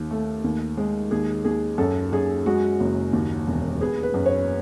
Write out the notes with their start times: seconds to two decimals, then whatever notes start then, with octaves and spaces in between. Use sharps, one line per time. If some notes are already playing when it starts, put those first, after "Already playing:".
Already playing: D#2
0.11 A3
0.44 D#2
0.78 G#3
1.11 D#2 G#4
1.44 D#2 G#4
1.78 F#2 A4
2.12 F#2 G#4
2.46 G#3 F#4
2.80 F#1
3.13 D#2
3.47 E1
3.81 B3 G#4
4.03 B4
4.14 F#2
4.26 C#5